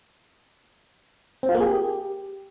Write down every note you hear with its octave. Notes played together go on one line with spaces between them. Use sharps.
C4
F4
A#3
G#4
G4